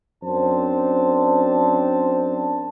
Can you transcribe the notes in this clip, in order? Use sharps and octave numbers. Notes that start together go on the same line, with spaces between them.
F#2 C4 D4 C5 A5